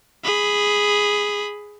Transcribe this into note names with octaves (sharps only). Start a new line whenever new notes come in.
G#4 B5